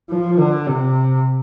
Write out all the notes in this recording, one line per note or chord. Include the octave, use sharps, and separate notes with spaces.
F3
D3
C3